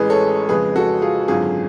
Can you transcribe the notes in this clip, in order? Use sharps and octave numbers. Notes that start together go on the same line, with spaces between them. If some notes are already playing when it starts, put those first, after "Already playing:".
Already playing: A1 A2 G#3 G#4 B4
A4 C#5
F2 C#3 G#3 G#4 B4
F#4 A4
F4 G#4
G#1 F#2 D3 F4 G#4